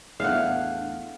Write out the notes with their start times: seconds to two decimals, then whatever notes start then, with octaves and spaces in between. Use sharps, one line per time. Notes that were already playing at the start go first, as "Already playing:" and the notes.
0.20 E2 A2 D4 F5 F#5